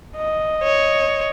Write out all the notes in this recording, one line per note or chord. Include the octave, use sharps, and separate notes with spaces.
D#5
C#5